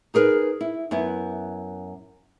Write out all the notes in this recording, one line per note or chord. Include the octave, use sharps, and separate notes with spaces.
D#4 G#4 A#4 B4
E4
F#2 B3 E4